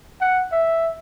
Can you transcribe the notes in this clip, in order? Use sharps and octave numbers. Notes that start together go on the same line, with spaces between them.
F#5
E5